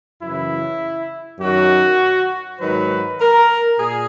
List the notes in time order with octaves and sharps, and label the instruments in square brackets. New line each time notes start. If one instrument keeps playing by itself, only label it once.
[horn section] F#2 C#3 E3 E4
F#2 D#3 F#3 F#4
G#2 D#3 F#3 B4
A#4
A#2 G#4